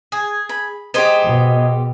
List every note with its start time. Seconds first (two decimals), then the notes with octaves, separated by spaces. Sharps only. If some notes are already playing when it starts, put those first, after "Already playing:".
0.12 G#4
0.49 B5
0.94 G#3 B3 D#4 G4 C5
1.24 B2